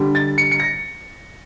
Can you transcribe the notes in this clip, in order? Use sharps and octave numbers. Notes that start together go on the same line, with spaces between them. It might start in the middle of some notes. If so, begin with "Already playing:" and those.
Already playing: D3 G3
A6
C#7
C#7
A#6